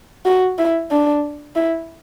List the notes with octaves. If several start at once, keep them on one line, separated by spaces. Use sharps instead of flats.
F#4
E4
D4
E4